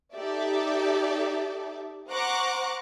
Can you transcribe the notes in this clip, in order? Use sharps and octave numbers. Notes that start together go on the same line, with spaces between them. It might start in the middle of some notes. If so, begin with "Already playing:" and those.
D#4 G4 A4 D5 E5
C5 F#5 A#5 C#6 D6 F#6